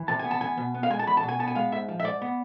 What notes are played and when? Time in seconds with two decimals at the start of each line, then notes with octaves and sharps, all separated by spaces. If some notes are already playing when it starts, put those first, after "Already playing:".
Already playing: E3
0.08 C3 A5
0.19 B3 G#5
0.31 A5
0.41 E2 G#5
0.58 B2
0.74 B3
0.83 F5
0.90 G#3 G#5
0.99 A5
1.07 E2 B5
1.17 A5
1.23 B2
1.29 G#5
1.39 B3 A5
1.48 G#5
1.55 G#3 F5
1.72 G#2 E5
1.88 F3
2.00 E5
2.04 G#2 D5
2.22 B3